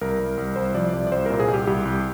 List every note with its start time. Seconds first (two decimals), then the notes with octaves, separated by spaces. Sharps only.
0.01 C2 A#4
0.20 C2
0.38 C2
0.56 C2 C5
0.74 F3 D5
0.93 C2 D5
1.07 D5
1.12 C2 C5
1.26 A#2 A#4
1.40 G#4
1.48 C2
1.54 G4
1.67 C2 G4
1.85 C2